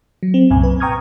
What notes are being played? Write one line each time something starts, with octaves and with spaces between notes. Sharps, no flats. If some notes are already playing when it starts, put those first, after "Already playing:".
F#3
C4
C2 F#2 A#2 G#5
B4
G5 A#5 C#6 D#6 F6 G#6